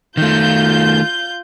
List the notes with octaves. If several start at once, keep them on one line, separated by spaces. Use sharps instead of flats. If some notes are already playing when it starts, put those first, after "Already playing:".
D#3 A3 F4 G6